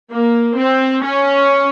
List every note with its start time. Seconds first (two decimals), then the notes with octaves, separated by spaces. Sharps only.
0.11 A#3
0.57 C4
1.04 C#4